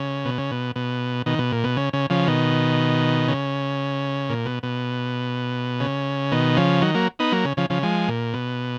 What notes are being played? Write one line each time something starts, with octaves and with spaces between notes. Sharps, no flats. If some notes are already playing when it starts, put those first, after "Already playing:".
Already playing: C#3
B2
C#3
B2
B2
B2 D#3
B2
A#2
B2
C#3
C#3
C#3 F3
B2 D#3
C#3
A#2
B2
B2
C#3
B2 D#3
C#3 F3
D#3 F#3
F#3 A#3
B3 D#4
F#3 A#3
C#3
C#3 F3
C#3 F3
F3 G#3
A#2
B2